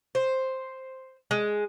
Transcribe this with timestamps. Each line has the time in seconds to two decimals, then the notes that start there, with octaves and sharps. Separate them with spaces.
0.15 C5
1.31 G#3